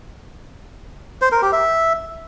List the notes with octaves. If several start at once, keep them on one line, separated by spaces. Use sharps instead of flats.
C5
A#4
G4
E5